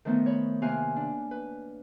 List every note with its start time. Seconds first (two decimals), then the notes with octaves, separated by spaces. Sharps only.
0.05 D#3 F3 A3 B3 D#4
0.26 C#5 B5
0.62 C3 A#3 F5 G#5 F#6
0.96 D4
1.31 B4